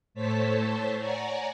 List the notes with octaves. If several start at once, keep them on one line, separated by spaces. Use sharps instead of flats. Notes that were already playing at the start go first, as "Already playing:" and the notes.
A2 A3 C5 C#5 A5 B6
C#5 D5 F#5 G#5 A#5